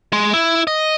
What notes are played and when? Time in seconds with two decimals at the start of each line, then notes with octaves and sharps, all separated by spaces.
0.13 G#3
0.33 E4
0.67 D#5